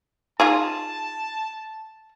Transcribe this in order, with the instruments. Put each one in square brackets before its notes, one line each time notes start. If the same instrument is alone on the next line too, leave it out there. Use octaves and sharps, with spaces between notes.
[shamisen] D#4 F4 G#4 [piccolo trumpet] A5